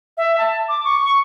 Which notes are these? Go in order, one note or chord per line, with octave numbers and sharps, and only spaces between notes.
E5
A5
D6
C#6